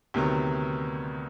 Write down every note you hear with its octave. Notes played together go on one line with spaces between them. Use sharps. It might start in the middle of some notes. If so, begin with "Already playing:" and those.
D2 C3 D#3 F#3 B3